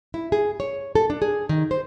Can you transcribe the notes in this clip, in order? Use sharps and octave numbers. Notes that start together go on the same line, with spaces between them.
E4
G#4
C#5
A4
D4
G#4
D#3
C5